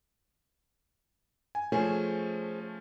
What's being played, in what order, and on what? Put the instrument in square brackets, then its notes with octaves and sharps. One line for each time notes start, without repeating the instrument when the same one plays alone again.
[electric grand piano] G#5
[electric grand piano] F3 A3 C#4 [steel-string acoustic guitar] G#4 C5